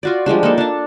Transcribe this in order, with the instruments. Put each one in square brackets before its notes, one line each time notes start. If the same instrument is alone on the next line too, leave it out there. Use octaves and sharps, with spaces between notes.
[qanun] F4 F#4 D5
F3 G3 G#3 D4
A#3 D#4 A4
D4 A5